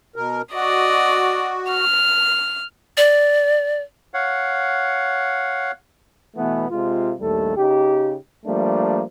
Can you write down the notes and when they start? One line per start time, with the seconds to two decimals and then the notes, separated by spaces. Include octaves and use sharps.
0.16 B2 A#4
0.54 F#4 D5 D#5
1.70 F6
2.97 D5
4.14 C#5 F5 F#5
6.37 B2 E3 A3 B3
6.70 C3 G#3 F4
7.19 A#1 D#2 G3 A3 A4
7.56 C#3 D#4 G4
8.46 F3 G3 A3 A#3 D4